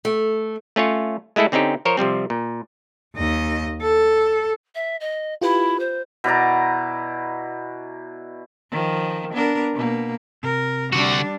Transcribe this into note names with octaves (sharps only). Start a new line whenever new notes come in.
A3
A3 C#4 F4 C#5
G#3 A3 E4 G#4 A4
D3 C4 C#4 D#4 G4
F3 A#4 C5 C#5
C3 F3 G3 C4
A#2
D#2 D#5
A4
E5
D#5
E4 F4 G4 B4
C5
B2 E4 D5 A#5
D#3 F3
B3 D4 A#4
B2 A#3
C3 A#4
D3 G3 D4 F#4